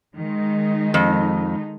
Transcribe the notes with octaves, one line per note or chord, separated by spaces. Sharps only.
D#3 G#3 D#4
F2